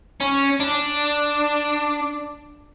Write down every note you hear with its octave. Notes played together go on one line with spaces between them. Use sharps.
C#4
D4